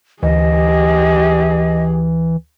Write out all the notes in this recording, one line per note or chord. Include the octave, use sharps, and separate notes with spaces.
D2 E3 G4 G#4 D#5